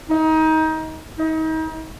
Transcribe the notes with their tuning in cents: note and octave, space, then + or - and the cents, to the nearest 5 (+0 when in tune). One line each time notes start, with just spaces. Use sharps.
D#4 +25
D#4 +35